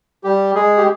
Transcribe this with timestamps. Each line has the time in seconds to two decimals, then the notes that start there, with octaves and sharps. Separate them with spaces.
0.24 G3 G4
0.55 G#3 G#4
0.77 G4